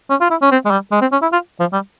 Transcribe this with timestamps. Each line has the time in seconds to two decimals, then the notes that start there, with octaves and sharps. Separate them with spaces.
0.10 C#4
0.21 F4
0.30 E4
0.42 C#4
0.51 C4
0.65 G#3
0.71 G3
0.92 G#3
1.01 C4
1.12 C#4
1.22 E4
1.32 F4
1.60 F3
1.72 G3